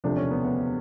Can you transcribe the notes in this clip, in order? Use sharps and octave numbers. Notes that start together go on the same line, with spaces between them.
E1 D2 C3 F3 A3 D4
C#4
B3
B3